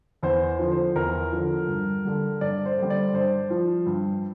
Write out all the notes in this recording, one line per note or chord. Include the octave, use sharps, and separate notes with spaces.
E2 C5
D3 F3
C5
E2 A#4
D3 F3
G2
D3 G3
G2 D5
C5
D3 G3
D5
G2 C5
F3
G2